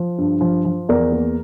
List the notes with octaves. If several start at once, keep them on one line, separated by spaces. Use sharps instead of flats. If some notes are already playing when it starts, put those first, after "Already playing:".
Already playing: F3
G2
F3
F3
E2 A#4 D5
A#3